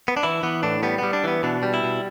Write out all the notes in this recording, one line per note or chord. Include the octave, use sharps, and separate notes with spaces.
B3
D4
E3 E4
E3 B3
A2 D4
G3 B3
B3
G3
D4
E3 B3
B2 D4
G3
E4
B2